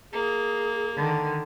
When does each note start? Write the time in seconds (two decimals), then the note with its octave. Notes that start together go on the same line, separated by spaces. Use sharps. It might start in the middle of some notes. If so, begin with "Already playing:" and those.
0.13 A#3 G#4
0.96 D3 D#3